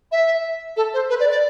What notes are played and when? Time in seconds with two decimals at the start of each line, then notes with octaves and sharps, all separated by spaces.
0.12 E5
0.77 A4
0.94 C5
1.10 B4
1.20 D5
1.31 D5